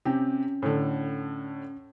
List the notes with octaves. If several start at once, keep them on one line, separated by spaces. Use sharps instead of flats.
C3 C#4 G4
A2 D3